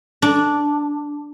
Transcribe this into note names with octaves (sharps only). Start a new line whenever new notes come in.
D4